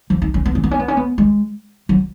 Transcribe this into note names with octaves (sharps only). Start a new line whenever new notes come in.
F3
D#4
C#4
B3
C#4
B3
C#4
B3
C#4
B3
G#3
F#3